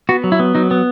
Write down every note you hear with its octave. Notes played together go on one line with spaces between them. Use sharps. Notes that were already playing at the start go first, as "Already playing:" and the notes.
B3 F#4
F#3
E4
B3
F#3 D#4
B3